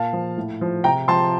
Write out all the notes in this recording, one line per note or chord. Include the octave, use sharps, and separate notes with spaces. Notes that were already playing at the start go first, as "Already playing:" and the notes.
Already playing: A#2 F5 A5
F3
A2
F3
C3 G5 A#5
F3 A5 C6